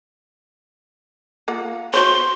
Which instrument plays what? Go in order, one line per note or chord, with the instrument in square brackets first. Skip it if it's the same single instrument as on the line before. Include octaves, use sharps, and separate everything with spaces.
[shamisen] A#3 F4 F#5
[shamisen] F#4 C5 C#5 [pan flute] C6